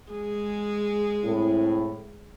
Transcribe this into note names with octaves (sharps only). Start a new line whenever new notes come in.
G#3 G#4
A2 C4 E4